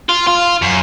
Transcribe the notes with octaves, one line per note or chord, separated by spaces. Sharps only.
F4
F4
F#2